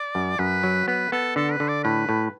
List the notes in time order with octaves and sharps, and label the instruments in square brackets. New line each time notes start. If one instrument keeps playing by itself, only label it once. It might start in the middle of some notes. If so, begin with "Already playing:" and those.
Already playing: [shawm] D5
[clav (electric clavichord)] F#2
[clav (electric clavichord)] F#2 [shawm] B4
[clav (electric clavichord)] F#3
[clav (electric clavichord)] B3 [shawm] B4
[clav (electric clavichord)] B3 [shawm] A4
[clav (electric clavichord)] D3 [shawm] A4
[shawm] B4
[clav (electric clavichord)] D3
[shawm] D5
[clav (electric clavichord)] A2 [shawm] B4
[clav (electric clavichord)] A2